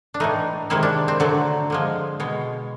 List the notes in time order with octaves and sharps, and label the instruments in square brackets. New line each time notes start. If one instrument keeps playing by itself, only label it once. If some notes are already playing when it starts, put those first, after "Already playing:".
[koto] D4
A2 E3 A3 D#4
C3 D#3 G#3 E4
D4
C4
D3 F#3 A3
D3 F3 G#3
B2 G#3